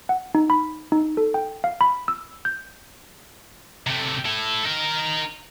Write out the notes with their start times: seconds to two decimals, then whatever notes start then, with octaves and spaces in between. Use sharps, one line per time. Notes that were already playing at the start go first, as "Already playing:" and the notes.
0.09 F#5
0.35 D#4
0.50 B5
0.92 D#4
1.17 A4
1.34 G5
1.64 F5
1.81 B5
2.08 E6
2.45 G6
3.87 C3 A3
4.26 E4 A4
4.65 D#4 A#4